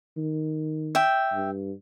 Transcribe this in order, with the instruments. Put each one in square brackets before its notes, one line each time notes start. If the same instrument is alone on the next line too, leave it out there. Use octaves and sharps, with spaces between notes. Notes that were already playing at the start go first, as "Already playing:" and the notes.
[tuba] D#3
[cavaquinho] E5 G5
[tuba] G2